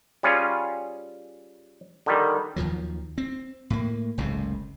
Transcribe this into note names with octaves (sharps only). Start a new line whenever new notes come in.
G3 C#4 F4 G#4
D3 D#3 G3
D#2 D#3 F3 F#3
C4
A2 A#3
F#1 C#2 A2 C3